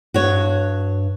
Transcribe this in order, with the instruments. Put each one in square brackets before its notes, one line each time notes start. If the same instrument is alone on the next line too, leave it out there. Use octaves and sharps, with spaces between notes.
[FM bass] G2 [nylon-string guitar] F#4 C#5